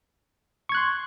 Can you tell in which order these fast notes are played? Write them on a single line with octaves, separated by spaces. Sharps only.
C#6 G#6 F#6 C6